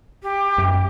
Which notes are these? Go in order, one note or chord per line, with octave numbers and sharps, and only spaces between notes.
G4
F#2